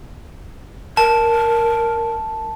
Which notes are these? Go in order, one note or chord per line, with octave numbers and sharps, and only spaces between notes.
A#4 A5